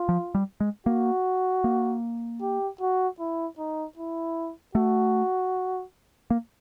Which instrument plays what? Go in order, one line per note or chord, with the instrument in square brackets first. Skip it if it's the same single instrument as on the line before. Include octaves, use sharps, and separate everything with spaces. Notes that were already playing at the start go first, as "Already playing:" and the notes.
Already playing: [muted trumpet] F4
[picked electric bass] F3
G3
G#3
[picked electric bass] A#3 [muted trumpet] F#4
[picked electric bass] A#3
[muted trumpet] G4
F#4
E4
D#4
E4
[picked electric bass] A3 [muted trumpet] F#4
[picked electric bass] A#3